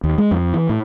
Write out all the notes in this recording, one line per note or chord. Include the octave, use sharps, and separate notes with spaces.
D#2
G#3
F2
E3
A2